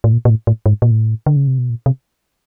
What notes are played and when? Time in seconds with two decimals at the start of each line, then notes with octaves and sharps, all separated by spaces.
0.04 A2
0.13 A#2
0.25 A#2
0.30 A2
0.47 A2
0.66 G#2
0.82 A#2
0.91 A2
1.26 D3
1.36 C#3
1.47 C3
1.58 B2
1.70 A#2
1.86 C3